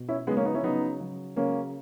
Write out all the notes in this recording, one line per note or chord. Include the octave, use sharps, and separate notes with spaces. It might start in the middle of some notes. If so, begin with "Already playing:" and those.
Already playing: B2
C#4 E4
C#3 F#3 G#3 B3
A#3 C#4
B3 D#4
C#4 E4
C#3 F#3 B3 D#4
C#3 F#3
C#3 F#3 A#3 C#4